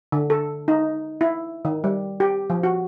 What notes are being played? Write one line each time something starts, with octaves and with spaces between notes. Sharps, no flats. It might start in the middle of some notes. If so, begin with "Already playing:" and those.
D3
A4
D#4
E4
D#3
G3
G4
F3
F#4